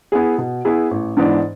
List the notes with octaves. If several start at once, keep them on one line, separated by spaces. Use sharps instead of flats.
B3 E4 G#4
B2
B3 E4 G#4
A1
G#2 E3 B3 D4